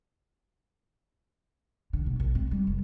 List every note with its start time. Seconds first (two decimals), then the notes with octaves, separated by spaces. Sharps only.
1.93 D3
2.06 B2
2.20 A#1
2.35 C4
2.51 G3
2.67 F1